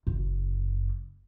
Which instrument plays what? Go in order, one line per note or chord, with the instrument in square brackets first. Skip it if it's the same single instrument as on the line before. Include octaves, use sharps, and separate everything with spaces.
[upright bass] F#1